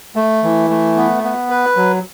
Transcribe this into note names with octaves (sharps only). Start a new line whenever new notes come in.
A3
E3
A3
B3
B3
B4
F#3